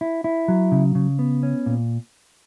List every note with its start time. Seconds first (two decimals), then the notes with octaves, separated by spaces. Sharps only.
0.01 E4
0.24 E4
0.48 F#3
0.72 C#3
0.95 C#3
1.19 B3
1.43 C#4
1.66 A#2